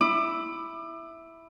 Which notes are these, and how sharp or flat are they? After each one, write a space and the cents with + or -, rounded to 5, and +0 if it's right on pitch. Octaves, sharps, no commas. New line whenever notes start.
E4 +0 D6 +35